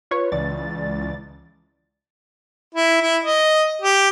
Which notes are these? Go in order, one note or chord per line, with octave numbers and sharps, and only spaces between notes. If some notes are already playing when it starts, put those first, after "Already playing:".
F4 B4 C#5
C#2 E3 D5 A6
E4
E4
D#5
G4